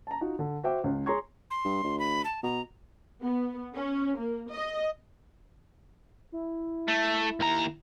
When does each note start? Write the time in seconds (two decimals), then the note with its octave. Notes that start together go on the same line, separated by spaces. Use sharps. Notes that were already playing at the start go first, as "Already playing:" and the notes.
0.07 A5 A#5
0.21 D#4 F4 F#4
0.39 D3
0.64 F#4 C5 E5 G5 D6
0.84 C#2
1.06 G#4 C#5 A#5 C6 C#6 G#6
1.51 C6
1.65 G2
1.83 D2
1.99 B5
2.25 A5
2.43 B2 A#5
3.23 B3
3.75 C#4
4.18 A#3
4.52 D#5
6.32 E4
6.88 A3
7.40 D#2 A#5